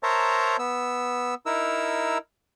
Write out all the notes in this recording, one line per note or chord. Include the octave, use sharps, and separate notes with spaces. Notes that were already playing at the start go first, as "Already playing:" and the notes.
A#4 C5 C#5 E5 A5 A#5
B3 E6
D#4 E4 A#4 E6